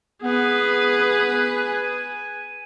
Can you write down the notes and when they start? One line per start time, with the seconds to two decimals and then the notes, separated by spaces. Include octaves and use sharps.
0.23 B3 G#4 B4
1.57 G#5